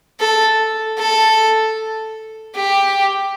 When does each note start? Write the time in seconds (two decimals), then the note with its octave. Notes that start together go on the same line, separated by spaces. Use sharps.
0.21 A4
0.99 A4
2.56 G4